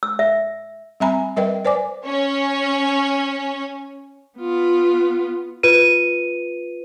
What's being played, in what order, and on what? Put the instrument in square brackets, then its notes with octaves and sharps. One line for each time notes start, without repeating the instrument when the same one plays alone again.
[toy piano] E6
E5
[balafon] G3 C4 E5 G#5 A#5 B5
G3 A#4 B4 D#5 E5 G5
B4 C5 D5 G#5 D6
[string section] C#4 C#5
[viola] B3 F4
[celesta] F4 B4 D#7